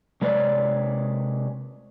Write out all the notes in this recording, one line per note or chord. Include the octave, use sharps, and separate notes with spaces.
C3 G#3 B4 C#5 D5